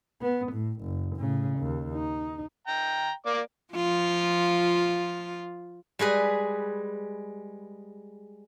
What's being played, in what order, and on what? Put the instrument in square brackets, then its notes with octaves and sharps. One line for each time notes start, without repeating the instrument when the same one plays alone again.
[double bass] B3
A2
F#1
A2 C#3
D#2
D#4
[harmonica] G5 A#5
A#3 D5 D6
[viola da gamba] F3 F4
[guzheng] G3 G#3 G#4 B4